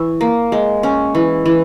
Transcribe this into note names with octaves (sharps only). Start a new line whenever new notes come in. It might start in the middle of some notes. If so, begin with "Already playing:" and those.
Already playing: E3 C#5 E5
A#3
G#3
C#4
E3
E3